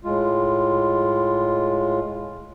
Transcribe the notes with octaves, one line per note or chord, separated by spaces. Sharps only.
A2 G#3 F4